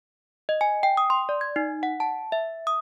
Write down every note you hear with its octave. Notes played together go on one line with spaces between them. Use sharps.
D#5
G#5
G5
D#6
C6
D5
G#6
D#4
F#5
A5
E5
D#6